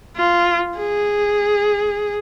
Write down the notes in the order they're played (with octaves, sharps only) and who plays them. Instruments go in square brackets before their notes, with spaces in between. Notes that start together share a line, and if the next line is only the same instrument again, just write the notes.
[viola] F4
G#4